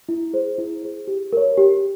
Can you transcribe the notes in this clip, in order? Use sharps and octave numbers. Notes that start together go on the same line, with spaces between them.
E4
G#4 C5
E4
G#4 C5
G4
A#4 C#5
G4